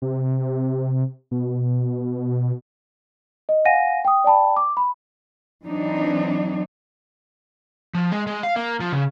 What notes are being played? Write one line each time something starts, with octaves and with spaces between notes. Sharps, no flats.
C3
B2
D#5
F5 F#5 G#5 A#6 D#7
G5 D#6
D5 G5 A5 B5
D6
B5
E3 F#3 C4 D4 D#4
F3
G#3
G#3
F5
A#3
F3
C#3